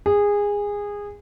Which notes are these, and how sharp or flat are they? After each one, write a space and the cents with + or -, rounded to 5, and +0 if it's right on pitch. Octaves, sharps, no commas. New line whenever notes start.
G#4 -20